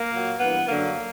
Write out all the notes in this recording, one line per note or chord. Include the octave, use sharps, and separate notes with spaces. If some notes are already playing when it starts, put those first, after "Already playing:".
Already playing: A#3
A#2 F#3
G2 E3 B3
F#2 D3 F#3 A#3